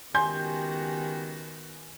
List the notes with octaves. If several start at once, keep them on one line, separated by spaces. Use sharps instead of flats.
C#2 D#3 B3 F#4 G4 G#5 C6 G6